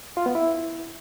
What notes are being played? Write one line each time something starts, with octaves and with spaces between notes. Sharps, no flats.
F4
B3
E4